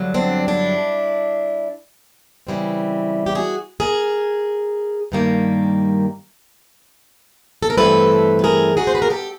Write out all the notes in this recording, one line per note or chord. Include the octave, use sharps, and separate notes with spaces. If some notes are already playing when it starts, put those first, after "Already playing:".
Already playing: G2 D3 F#3
C4 D4
D4 E4
C#3 E3 G3 C4
G4
F#4 G#4
G#4 A#4
G2 D#3 G3 A#3
A4
A#4
G2 E3 A3 C4 A4 B4
B4
G#4 A#4
F#4 G#4
C5
B4
A#4
G4 A4